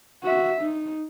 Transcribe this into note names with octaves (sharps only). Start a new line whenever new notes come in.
F#4 E5
D#4